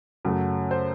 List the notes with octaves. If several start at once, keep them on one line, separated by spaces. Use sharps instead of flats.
F#2 C#3 F#3 A3 F#4
C5